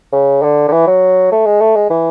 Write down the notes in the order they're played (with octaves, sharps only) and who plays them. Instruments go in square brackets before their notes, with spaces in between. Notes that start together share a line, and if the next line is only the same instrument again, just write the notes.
[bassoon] C#3
D3
D3
E3
F#3
A3
G#3
A3
G#3
E3